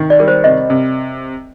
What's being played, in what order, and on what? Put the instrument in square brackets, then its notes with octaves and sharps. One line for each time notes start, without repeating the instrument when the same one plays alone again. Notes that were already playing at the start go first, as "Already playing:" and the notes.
Already playing: [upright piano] C3 D#3
[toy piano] D5
[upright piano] G3 [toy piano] A#4
[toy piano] C5
[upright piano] C3 [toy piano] D#5
[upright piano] C3